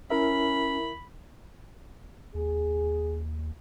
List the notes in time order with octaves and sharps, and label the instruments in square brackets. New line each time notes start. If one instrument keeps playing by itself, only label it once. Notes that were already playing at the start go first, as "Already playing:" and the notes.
[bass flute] C#4 [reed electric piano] E4 A#4 E5 [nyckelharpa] B5
[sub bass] D#2 [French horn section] G#4